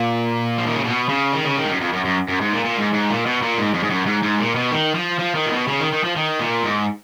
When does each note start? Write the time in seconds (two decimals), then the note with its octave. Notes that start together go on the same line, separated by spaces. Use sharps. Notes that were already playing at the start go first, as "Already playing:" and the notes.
Already playing: A#2
0.58 F3
0.66 D#3
0.75 C#3
0.84 B2
1.09 C#3
1.32 D#3
1.45 C#3
1.57 D#3
1.65 G#2
1.68 F#2
1.81 F2
1.93 F#2
2.05 F#2
2.29 F#2
2.41 G#2
2.53 A#2
2.65 A#2
2.78 G#2
2.94 G#2
3.10 A#2
3.26 B2
3.42 A#2
3.58 G#2
3.74 F2
3.84 G#2
3.91 F#2
4.06 G#2
4.23 G#2
4.39 A#2
4.55 B2
4.71 D#3
4.95 F3
5.19 F3
5.35 D#3
5.47 A#2
5.52 B2
5.68 C#3
5.80 D#3
5.92 D#3
6.04 F3
6.16 D#3
6.41 A#2
6.65 G#2